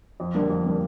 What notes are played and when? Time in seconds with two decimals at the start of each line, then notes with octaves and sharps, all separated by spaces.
0.20 F2
0.34 D3 G3 A#3 D4
0.50 F2
0.64 D3 G3 A#3 D4